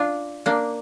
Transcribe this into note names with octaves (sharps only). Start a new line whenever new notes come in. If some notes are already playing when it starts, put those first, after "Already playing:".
Already playing: D4 F4
A#3 D4